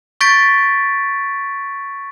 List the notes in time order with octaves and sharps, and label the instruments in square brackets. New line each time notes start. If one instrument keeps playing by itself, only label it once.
[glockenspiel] C#6 G6 A6 B6 D7